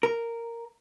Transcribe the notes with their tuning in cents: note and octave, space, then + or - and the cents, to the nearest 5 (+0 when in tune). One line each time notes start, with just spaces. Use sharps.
A#4 -5